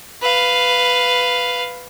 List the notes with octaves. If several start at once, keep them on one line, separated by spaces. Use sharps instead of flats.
B4 F5